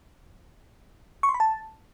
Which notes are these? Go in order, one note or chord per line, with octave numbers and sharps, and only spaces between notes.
C#6
C6
B5
A5